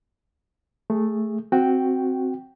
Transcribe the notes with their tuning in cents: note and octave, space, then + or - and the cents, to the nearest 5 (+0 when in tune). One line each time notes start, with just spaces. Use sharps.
A3 +0 G#4 -20
C4 +0 F#4 +0 G5 +0